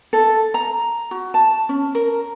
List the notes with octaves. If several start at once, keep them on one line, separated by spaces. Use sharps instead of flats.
A4
A#5
F#4
A5
C#4
A#4